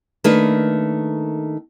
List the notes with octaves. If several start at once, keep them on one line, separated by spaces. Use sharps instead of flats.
D#3 A3 A#3 D4 B4